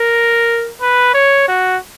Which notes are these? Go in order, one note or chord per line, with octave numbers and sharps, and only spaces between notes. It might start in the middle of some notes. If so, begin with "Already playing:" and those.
Already playing: A#4
B4
C#5
F#4